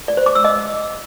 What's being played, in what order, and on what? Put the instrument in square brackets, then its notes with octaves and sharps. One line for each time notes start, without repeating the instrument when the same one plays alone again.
[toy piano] D5
C5
D6
E6
D#5